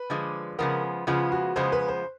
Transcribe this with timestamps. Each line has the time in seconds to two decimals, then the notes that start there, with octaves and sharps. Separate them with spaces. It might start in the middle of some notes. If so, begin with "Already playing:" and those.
Already playing: B4
0.10 D3 F3 G#3
0.58 C#3 F3 G#3 B3 A#4
1.07 C#3 F3 G#3 B3 F4
1.32 F#4
1.56 C#3 F3 G#3 B3 C5
1.72 B4
1.88 C5